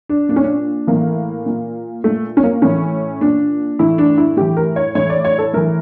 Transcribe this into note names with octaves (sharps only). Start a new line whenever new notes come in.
D4
A#2 D4
C#4
D4
A2 E3 A#3
A#2
A#2 A3
C#4
A#3
A2 E3 C#4
A#2 D4
A2 E3 E4
D4
E4
A2 E3 G4
A#4
C#5
A2 E3 C#5
D5
C#5
A4
A2 E3 A#4